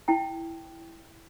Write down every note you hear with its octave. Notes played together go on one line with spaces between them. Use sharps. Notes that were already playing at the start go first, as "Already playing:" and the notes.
E4 G5 A5